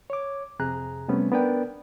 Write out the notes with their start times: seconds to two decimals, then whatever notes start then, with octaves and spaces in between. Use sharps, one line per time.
0.10 C#5 D6
0.59 F2 C3 G#4 A#5 F#6
1.09 C3 G3 A3 B3 C#4
1.32 B3 D4 A#4 B4 D5 G5